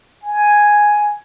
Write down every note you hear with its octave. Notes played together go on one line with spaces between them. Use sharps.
G#5